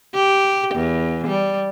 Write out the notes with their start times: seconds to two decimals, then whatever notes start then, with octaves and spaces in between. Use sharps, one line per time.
0.14 G4
0.75 E2
1.27 G3